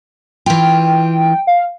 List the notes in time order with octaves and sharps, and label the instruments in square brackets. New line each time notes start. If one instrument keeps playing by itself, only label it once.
[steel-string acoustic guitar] E3 F4 [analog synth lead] G5
[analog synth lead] F5